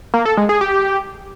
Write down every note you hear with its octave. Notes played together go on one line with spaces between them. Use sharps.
A#3
A4
G#3
G#4
G4